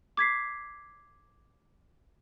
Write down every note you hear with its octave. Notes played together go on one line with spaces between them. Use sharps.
D6 G#6 B6 C7